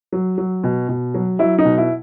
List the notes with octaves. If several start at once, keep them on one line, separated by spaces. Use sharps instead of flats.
F#3
F#3
B2
B2
F#3
F#3 E4
D#4
B2
E4